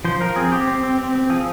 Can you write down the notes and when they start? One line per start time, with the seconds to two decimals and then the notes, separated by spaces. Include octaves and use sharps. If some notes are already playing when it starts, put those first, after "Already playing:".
0.05 F3 C5
0.21 F3 A#4
0.36 C4 G#4
0.52 C4 G4
0.67 C4
0.83 C4
0.98 C4
1.15 C4
1.30 F3 G#4